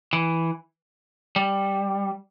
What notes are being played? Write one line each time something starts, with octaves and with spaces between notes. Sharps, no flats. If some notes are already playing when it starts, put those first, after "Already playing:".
E3
G3